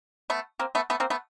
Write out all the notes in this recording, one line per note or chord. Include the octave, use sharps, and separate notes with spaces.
A3 B3
A#3 C4
A3 B3
A3 B3
A#3 C4
A3 B3